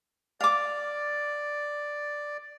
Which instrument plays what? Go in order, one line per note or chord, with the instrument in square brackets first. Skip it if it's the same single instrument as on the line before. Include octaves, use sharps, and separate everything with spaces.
[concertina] D5 [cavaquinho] F5 D6